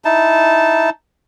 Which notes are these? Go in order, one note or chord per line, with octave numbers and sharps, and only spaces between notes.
D#4 E4 A5